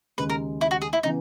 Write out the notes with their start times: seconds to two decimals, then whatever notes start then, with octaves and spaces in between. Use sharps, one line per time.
0.18 D#2 C#3 G#3 B4
0.30 A#4
0.61 E4
0.71 F#4
0.82 G#4
0.93 E4
1.03 C#3 E3 B3 D#4